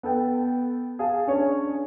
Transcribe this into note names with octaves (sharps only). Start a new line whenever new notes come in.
B3 A4 G5
G#4 F5 A5
C#4 D4 C#5